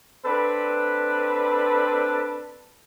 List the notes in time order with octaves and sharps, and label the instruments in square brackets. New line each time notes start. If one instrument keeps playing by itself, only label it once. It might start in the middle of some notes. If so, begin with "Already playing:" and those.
[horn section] C4 D4 A4 B4